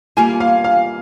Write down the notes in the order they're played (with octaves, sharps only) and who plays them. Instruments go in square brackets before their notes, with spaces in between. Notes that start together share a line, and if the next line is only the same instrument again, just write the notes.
[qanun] G3 A#3 F4 [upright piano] G#5
[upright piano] F5
F5